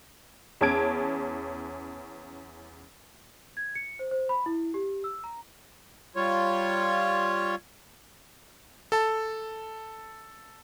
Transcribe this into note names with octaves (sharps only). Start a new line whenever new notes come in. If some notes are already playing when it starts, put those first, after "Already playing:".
E2 C#4 A5 G#6 D7
G#6
C#7
C5
C5
B5
E4
G4
E6
A#5
G3 F4 C#5
A4 A5